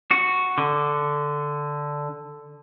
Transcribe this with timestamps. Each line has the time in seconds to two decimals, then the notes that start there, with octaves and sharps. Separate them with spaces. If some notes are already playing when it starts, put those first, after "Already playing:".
0.11 F#4
0.58 D3